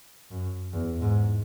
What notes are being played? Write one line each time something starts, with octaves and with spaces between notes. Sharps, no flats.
F#2
E2
G#2